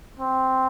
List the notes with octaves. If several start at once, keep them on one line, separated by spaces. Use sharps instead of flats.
C4